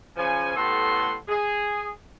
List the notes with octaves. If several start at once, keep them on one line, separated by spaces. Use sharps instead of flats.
C#3 F3 G#5
A2 B3 G4 A4 F#5 C6
G#4